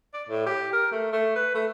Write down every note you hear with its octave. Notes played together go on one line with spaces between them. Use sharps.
D5
A2
G4
A#4
A3
A3
B4
A3